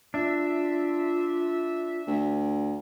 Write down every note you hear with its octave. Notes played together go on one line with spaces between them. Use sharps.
D4 F4 E5
D2